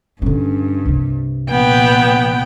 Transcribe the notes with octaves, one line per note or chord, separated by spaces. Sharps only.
G2 D3 C#4
C2 C3
A#2 B3 G5